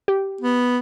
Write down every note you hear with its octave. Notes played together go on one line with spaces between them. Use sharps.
G4
B3